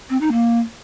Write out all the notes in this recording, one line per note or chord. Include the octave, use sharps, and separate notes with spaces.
C4
D#4
A#3